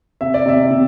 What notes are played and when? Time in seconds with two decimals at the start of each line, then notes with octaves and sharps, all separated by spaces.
0.21 C3 E5
0.34 D5
0.46 C3 E5
0.71 C3